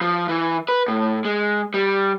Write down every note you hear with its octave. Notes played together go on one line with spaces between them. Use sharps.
F3
E3
B4
A2
G#3
G3